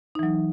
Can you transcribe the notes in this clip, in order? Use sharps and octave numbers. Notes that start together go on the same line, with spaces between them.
E3 F#3 D#4